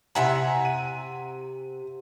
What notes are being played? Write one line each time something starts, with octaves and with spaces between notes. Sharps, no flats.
C3 E4 E5 F#5 G#5 A#5
D#7